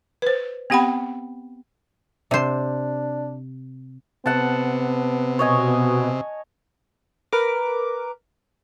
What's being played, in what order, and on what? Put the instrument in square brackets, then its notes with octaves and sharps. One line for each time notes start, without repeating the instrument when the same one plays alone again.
[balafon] B4 C5
B3 C4 G4 F#5 G5 B5
[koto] C3 C5 [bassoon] D4
[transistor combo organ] C3 [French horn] B3 [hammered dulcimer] F#5 A5
[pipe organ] B2 [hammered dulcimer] C#5 D#5 G#5
[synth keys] A#4 B4 D6